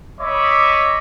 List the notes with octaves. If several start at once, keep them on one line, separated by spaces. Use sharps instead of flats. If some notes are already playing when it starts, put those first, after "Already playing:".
C#5 D#5 E5 B5 D6